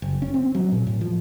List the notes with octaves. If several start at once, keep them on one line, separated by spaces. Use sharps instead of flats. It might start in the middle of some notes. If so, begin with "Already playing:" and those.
F#1
C#4
C4
F#3
A#2
A2
F3